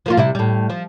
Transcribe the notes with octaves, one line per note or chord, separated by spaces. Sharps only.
F3 A#3 F4
C3 G3 E4
A2 G3
F3